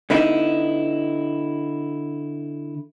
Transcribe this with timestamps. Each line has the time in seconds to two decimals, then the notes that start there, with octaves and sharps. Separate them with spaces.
0.10 D3 B3 D#4 E4